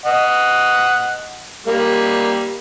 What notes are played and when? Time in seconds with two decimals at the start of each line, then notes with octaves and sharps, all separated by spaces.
0.06 D#5 F#5
1.67 G3 A#3